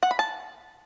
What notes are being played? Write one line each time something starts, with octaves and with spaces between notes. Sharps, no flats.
F#5
B5
A5